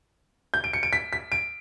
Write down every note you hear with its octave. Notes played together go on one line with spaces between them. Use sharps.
G6
D7
C#7
D7
B6
B6
D7